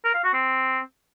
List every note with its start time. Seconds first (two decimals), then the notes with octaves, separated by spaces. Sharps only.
0.05 A#4
0.14 F5
0.24 F#4
0.34 C4